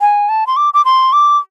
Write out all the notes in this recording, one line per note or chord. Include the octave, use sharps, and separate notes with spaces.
G#5
A5
C6
D6
D6
C6
D6